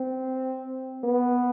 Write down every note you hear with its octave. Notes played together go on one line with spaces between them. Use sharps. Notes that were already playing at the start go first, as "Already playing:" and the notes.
Already playing: C4
B3